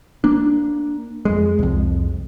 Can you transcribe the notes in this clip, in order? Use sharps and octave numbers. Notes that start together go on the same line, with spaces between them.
A#3 D4
F2 G#3
C2 F2